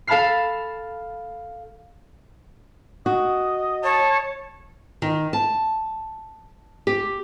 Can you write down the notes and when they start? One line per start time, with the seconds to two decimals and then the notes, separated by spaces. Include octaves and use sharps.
0.07 A4 F5 A5 B5 F6 C7
3.06 F#4 D#5
3.84 C#5 A5
5.02 D#3
5.33 A5
6.87 G4